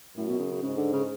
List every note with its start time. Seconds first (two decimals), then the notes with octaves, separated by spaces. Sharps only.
0.17 F#2 A2
0.29 B2
0.40 C#3
0.52 C#3
0.63 G#2 C#3
0.78 D3
0.93 C#3